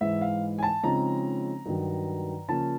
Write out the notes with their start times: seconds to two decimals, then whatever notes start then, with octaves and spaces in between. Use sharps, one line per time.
0.01 G#2 E3 G#3 E5
0.21 F5
0.58 G#5
0.63 A5
0.83 C#3 F3 G#3 C4 D#4 A#5
1.66 G2 D#3 F#3
2.48 C#3 F3 A#3 C#4 A5